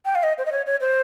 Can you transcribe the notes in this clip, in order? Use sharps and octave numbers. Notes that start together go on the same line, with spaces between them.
G5
F5
D#5
C5
D#5
C#5
C#5
C5